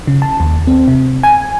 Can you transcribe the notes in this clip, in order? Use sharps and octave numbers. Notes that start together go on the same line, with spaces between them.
C#3
A5
D#2
C4
C3
G#5